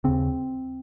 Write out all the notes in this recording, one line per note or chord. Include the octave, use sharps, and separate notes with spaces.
D#2 C#3 C4